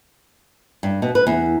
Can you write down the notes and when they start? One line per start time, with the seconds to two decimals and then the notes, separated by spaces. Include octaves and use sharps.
0.83 G2
1.02 B2
1.15 B4
1.27 E2